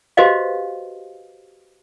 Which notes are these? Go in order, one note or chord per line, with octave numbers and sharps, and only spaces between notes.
F#4 G4 B4 C5 D#5 F5